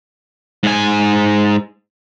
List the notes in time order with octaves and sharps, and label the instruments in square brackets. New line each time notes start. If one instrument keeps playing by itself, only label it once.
[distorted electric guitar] G#2 G#5